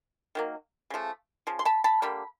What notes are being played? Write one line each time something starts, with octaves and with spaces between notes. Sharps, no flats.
D#3 F#3 A#3
C#3 F3 A3
C#3 F3
C6
A5 B5
A5 B5
D3 G3 A#3 B5